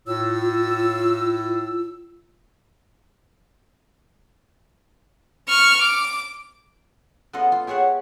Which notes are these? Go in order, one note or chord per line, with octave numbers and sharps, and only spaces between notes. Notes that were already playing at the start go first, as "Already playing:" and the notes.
A2 F4 E6
C#6 F6
D6
B3 F4 A4 D#5 F#5
F4
G4 G#4 C#5 E5 F#5